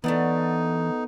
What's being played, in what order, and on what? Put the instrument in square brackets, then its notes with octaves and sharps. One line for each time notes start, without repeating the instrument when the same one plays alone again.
[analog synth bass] E3 [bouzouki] A3 D5 F#5 [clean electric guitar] B3 [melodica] D#4